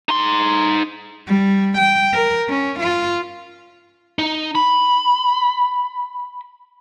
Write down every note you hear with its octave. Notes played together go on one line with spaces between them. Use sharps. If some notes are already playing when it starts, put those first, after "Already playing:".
D#4 C6
G3
G5
A#4
C#4
F4
D#4
B5